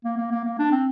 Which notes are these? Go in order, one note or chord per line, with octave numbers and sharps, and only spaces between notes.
A#3
A#3
A#3
A#3
D4
C4